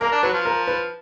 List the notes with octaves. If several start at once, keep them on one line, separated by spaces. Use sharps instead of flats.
A#3 A#4
D4
F#3 B4
F3
A#4
B4